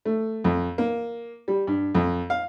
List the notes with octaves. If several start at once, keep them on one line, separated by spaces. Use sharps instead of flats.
A3
F2
A#3
G3
G2
F2
F5